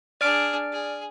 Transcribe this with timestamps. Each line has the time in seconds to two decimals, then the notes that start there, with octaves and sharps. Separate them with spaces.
0.21 D4 G#4 D5 F6 D7
0.72 G#4